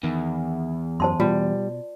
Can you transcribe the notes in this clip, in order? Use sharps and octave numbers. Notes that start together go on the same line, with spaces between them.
E2 D#3
F#2 C5 A5 C6
B2 G3 F4